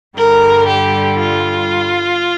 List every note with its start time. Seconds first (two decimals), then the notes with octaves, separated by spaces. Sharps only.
0.18 G2 D3 G3 A#4
0.68 G4
1.19 F4